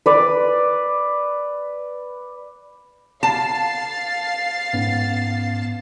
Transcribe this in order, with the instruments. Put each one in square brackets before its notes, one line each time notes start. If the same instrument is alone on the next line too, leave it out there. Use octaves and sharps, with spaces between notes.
[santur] B4 D5
[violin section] F5 A6 C7 [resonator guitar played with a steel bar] A5
[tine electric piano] G#2 B3 C#4